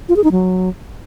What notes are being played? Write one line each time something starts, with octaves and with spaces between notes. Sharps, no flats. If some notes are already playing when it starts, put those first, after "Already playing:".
F4
G#4
D#4
F#3